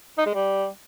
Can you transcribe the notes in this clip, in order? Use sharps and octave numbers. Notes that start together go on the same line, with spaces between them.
D#4
G#3
G3